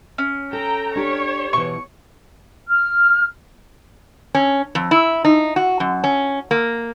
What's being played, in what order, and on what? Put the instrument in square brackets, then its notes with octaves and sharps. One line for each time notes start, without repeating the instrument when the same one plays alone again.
[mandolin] C#4
[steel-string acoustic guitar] A4 [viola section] G5 A#5
[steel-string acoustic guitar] D4 G4 [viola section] C#5
[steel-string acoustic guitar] B2 E3 [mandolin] C#6
[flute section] F6
[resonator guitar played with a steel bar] C#4
F2
E4
D#4
F#4
F#2
C#4
A#3